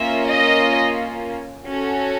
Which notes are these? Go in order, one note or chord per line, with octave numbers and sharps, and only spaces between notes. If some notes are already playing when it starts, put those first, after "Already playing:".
Already playing: A#3 C#4 F4 E5
D#5
C#4 F#4 A4